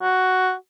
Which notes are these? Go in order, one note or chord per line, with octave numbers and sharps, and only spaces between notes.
F#4